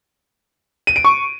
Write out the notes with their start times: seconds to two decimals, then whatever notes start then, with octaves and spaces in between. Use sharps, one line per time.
0.87 D#7
0.96 D7
1.05 C#6